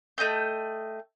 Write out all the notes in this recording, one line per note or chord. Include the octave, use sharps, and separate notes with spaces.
A3 D#5 G5 G6